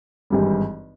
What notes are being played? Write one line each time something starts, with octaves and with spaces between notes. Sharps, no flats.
G#1 G2 E3 G3